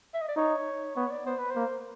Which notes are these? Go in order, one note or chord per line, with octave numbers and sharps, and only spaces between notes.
E5
D#5
D5
D#4 C#5
B3 C#5
D5
B3 C5
B4
A#3 C5